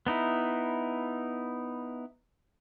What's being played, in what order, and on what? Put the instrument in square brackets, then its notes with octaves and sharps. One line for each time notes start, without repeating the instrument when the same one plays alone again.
[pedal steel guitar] B3 D#4 E4